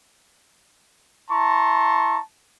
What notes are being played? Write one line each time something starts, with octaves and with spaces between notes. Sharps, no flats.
E4 A5 A#5 C6 C#6